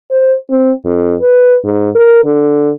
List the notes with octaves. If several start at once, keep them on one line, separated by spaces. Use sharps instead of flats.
C5
C4
F2
B4
G#2
A#4
D3